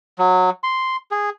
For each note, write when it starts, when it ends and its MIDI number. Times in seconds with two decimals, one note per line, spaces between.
0.18 0.50 54
0.63 0.96 84
1.11 1.30 68